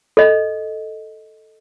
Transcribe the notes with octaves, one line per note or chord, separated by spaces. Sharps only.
A4 D#5